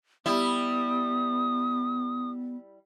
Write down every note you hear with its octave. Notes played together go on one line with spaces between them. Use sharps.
G3 B3 E4 D#6